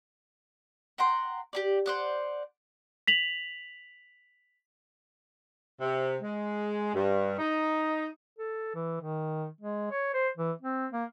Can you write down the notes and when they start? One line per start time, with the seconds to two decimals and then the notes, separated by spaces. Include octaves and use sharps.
0.98 F#5 G5 A#5 C6
1.53 G4 G#4 D5
1.86 C5 D5 F#5
3.07 B6 F7 F#7
5.79 C3
6.21 G#3
6.94 G2
7.37 D#4
8.38 A4
8.75 E3
9.01 D#3
9.61 G#3
9.91 C#5
10.14 C5
10.37 E3
10.61 C4
10.92 A#3